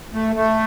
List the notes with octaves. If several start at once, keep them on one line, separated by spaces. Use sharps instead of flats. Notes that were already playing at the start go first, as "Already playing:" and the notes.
A3
A3